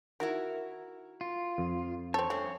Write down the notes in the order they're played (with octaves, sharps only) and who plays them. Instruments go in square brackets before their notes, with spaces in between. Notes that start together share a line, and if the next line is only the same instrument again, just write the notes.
[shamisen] D#3 [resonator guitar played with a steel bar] E4 F#4 A#4
[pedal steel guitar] F4
[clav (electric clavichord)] F2
[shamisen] C4 A4 [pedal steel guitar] C#5
[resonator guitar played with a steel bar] G2 C4 C#4 [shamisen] A3